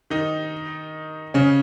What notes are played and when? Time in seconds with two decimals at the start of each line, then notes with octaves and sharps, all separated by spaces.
0.10 D#3 D#4
1.34 C#3 C#4